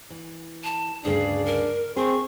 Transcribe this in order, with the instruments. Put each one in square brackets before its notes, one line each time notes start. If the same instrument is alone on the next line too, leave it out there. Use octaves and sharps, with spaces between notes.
[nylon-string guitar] E3
[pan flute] A5
[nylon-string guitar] D2 G2 C#3 [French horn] D4 [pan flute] G#4
[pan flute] A#4
[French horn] C4 [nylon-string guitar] G#4 [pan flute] C#6